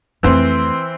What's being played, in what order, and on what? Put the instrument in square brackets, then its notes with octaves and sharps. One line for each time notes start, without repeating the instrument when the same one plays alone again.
[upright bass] F2 A3 [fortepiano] E3 C4